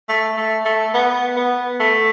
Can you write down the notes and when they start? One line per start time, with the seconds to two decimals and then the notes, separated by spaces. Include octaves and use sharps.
0.09 A3
0.37 A3
0.65 A3
0.94 B3
1.37 B3
1.80 A3